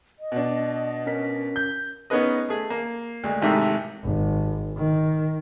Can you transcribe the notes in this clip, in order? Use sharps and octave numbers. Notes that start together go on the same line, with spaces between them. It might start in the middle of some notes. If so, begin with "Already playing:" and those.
D#5
B2 D4
C#4 A#4 B6
G6
B3 C#4 D#4 G#4 B4 D#5
A3 G#4
A#3
D2 G#3
A1 G#2 C3 D#3 A3 E5
G#1
D#3